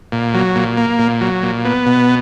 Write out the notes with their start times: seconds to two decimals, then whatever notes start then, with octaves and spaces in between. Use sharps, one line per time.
0.12 A#2
0.34 F#3
0.55 A#2
0.77 A#3
0.99 A#2
1.21 F#3
1.43 A#2
1.65 B3
1.86 B2